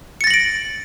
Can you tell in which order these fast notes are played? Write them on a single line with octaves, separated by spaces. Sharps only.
C#7 A6 A#6 F#7 D7